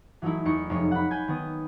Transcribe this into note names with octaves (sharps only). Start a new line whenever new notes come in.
E3 F#3 A3 D#4 E4
E2 D#4 C#6 C#7
F1 G#3 C#5 C#7
F#5 B5
G#5 B5 G6 G#6
D#3 B3 D#6